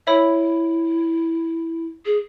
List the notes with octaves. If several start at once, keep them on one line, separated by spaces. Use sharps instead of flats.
E4 C#5 E5 B5 E6
G#4